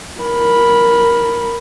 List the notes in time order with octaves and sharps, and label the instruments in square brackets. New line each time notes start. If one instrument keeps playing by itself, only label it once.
[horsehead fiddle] A#4 B5